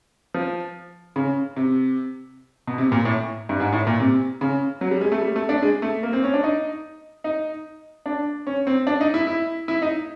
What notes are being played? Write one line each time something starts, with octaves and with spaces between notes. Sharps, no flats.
F3
C#3
C3
B2
C3
A#2
A2
G2
G#2
A2
A#2
C3
C#3
F#3
G3
G#3
A3
G3
A3
D4
G#3
A3
A#3
C4
C#4
D4
D#4
D#4
D4
C#4
C4
D4
D#4
E4
E4
E4
D#4